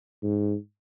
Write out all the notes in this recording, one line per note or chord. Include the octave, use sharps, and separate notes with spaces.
G#2